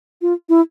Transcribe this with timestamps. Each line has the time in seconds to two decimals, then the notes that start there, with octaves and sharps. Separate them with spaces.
0.22 F4
0.49 E4